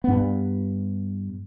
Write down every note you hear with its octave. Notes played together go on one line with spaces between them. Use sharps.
G2 B3